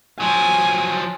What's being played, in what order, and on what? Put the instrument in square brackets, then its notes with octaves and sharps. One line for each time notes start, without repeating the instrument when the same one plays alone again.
[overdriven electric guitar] F3 F#3 [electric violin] G#5